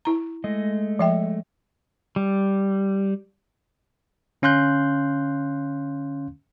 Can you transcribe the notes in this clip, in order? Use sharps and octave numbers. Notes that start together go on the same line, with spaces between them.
E4 A#5
G#3 A3 D#5
F3 E5 G5
G3
D3 C#4 F5 C6 F#6 G6